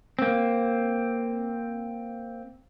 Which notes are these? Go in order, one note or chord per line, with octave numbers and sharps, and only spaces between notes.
A#3 C4